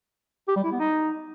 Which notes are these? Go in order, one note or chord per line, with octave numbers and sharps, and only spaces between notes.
G4
G3
E4
B3
D#4